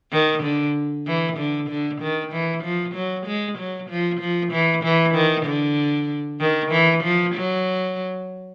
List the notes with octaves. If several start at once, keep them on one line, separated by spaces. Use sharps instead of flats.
D#3
D3
E3
D3
D3
D#3
E3
F3
F#3
G#3
F#3
F3
F3
E3
E3
D#3
D3
D#3
E3
F3
F#3